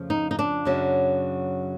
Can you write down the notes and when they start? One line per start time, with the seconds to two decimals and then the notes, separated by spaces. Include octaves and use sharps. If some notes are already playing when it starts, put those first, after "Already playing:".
Already playing: F2 C#3 F3 A3
0.10 D#4
0.31 D#4
0.39 D4
0.65 F#2 C#3 F#3